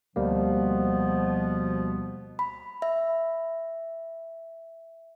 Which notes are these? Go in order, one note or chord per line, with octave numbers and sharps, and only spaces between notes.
D2 B2 F3 G3 A#3 B3
B5
E5